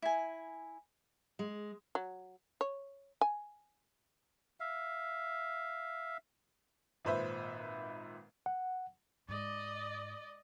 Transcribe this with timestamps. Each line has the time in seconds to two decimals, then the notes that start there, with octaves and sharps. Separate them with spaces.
0.02 E4 G#5
1.39 G#3
1.95 F#3
2.61 C#5
3.21 G#5
4.60 E5 F5
7.05 G#1 A#2 B4 C5 E5
8.46 F#5
9.29 G#2 D5 D#5